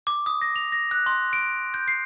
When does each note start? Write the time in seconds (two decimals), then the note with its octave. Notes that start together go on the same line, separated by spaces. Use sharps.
0.07 D6
0.26 D#6
0.42 A#6
0.56 F7
0.72 A#6
0.91 F#6
1.06 C6
1.33 D7
1.74 G6
1.88 C7